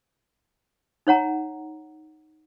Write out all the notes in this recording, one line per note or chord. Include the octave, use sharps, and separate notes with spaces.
D#4 C#5 F#5 A#5